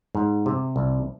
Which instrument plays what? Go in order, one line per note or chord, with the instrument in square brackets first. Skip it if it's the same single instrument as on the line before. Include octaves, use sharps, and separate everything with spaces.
[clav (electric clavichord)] G#2
C3
C2